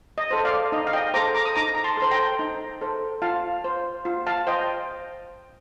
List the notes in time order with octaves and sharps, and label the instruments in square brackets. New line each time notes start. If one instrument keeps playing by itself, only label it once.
[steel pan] D#5
A4 C5
D5 F5
D#4 D#5
F5
D#5 G5
A4 C5 A#5 D6
A#5 D6
D#6
D#4 A#5 D6
A#5
A5 C6
A4 C5 C6
G5 A#5
D#4
A4 C5
F4 F5 A5
C5
F4
F5 A5
C5 D#5 G5